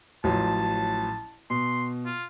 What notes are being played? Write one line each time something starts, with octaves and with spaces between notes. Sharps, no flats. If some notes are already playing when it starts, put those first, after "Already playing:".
A1 F3 F#3 A5
B2 C6
F4